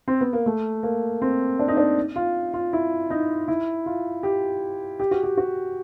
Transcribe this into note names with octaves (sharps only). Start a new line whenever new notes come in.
C4
B3
A#3
A3
A#3
C4
D4
D#4
D4
F4
F4
E4
D#4
E4
F4
G4
G4
F#4
G4
F#4